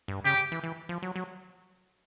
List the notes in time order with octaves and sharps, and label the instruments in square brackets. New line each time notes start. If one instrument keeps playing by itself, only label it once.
[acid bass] G2
[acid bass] C#3 [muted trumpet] G4
[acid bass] E3
E3
F3
F#3
F#3